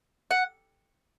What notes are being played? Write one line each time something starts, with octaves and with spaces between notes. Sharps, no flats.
F#5